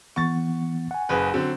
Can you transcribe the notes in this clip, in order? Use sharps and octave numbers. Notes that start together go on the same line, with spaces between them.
E3 B3 F#5 C#6 A6
F#5 G#5
F#1 G#4 B4
D3 F#3 C4